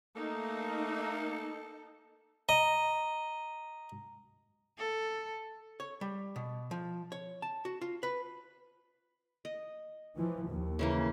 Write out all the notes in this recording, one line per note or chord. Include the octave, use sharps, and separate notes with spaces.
A3 A#3 D#4 A4
D#5 A#5
A4
C#5
G3
B2
F3
C#5
A5
F#4
F4
B4
D#5
E3 F3
D#2
C#3 E3 A#3